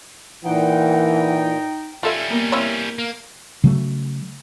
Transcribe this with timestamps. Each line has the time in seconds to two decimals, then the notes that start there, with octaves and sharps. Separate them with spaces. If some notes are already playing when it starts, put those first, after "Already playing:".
0.44 A#2 E3 D#4 F#5 G5
2.03 G3 C#4 F4 A4 E5
2.30 A#3 B3 A#4
2.52 C4 E4 C#5 F5 C#6 F6
2.98 A#3
3.64 C#3 F#3 A3